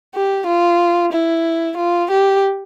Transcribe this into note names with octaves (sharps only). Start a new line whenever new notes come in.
G4
F4
E4
F4
G4